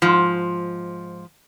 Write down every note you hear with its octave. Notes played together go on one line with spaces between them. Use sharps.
G#2 F3